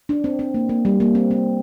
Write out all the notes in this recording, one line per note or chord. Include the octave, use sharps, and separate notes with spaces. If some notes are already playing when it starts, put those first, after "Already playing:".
D4
C4
C4
A#3
A#3
G3
A#3
C4
C4